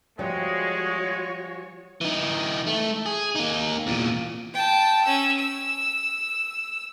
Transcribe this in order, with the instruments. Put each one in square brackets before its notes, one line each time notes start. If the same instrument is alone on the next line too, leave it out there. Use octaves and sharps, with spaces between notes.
[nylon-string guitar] F3 G3 [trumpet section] G#3 [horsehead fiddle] F#4 C#5
[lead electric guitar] E3 D#4
A3
G#4
A#3 D#4
E2 A#2
[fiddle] G5 A5
C#4 E6
E6